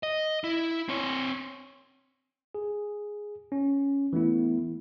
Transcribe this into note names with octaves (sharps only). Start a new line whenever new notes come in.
D#5
E4
C4 C#5
G#4
C#4
E3 A3 B3 E4